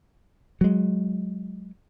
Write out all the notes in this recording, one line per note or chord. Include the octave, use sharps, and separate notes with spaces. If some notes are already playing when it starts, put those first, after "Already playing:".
F#3 G#3